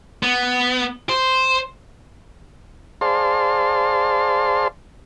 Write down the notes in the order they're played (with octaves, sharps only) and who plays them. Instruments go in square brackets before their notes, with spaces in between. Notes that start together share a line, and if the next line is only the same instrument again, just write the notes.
[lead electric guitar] B3
C5
[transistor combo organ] G#4 C5 D5 F5 A5 C6